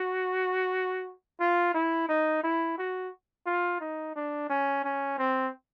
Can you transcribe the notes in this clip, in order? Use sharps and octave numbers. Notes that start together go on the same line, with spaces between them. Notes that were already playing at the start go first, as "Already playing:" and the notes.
Already playing: F#4
F4
E4
D#4
E4
F#4
F4
D#4
D4
C#4
C#4
C4